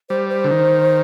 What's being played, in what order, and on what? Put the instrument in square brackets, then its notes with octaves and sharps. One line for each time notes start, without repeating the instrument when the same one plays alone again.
[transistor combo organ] G3 [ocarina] C5
[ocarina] C5
[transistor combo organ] D3
D#3